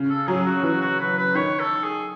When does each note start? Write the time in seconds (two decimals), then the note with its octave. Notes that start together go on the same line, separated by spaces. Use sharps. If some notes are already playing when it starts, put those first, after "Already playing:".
Already playing: C#3
0.10 A4
0.27 F#3 G#4
0.46 F#4
0.63 E3 F#4
0.81 F#4
1.00 B4
1.18 B4
1.35 D#3 C#5
1.59 A4
1.84 G#4